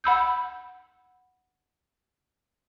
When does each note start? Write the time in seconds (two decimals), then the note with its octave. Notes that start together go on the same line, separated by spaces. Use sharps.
0.04 F#5 B5 E6 G6